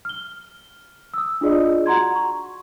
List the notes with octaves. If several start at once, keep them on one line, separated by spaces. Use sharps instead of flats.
F6 G7
D#6 E6
D4 F4 G#4 D5 D#5
F#4 F#5 A#5 C6 G#6
C#6